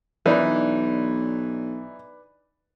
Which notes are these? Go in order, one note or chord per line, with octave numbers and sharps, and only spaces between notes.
B1 E3 D4 D#4 B4 D5 B5